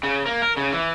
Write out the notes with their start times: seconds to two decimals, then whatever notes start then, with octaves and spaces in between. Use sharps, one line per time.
0.04 C#3
0.26 A#3
0.42 A#4
0.57 C#3
0.72 E3